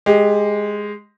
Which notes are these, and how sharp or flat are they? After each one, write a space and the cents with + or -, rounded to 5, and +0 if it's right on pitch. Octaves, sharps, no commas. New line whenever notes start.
G#3 +0 G4 +20